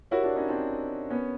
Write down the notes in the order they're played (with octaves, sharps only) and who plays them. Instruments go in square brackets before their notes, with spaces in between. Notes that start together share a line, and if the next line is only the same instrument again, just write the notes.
[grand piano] E4 F#4 [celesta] G4 A#4 C#5
[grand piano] D4 E4
C#4 D#4
C4 D4
B3 C#4